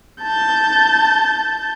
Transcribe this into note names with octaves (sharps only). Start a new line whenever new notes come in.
A5 G6